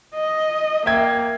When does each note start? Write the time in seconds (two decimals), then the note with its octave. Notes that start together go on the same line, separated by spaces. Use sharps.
0.15 D#5
0.86 A#3 E5 G5 G#6